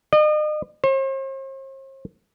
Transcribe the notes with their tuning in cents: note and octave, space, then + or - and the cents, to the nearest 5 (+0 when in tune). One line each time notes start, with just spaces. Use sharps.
D#5 -40
C5 +45